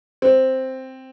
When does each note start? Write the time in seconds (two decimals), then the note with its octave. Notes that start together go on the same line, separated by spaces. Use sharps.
0.22 C4